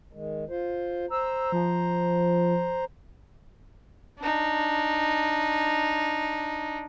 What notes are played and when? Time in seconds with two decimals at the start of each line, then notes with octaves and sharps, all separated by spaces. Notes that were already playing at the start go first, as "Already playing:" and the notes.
0.13 D#3 G#3
0.50 F4 C5
1.10 C5 A#5 E6
1.52 F3
4.20 D4 D#4